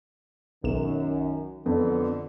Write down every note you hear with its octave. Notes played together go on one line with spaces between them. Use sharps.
B1 F#2 D#3 E7
F2 D3 B3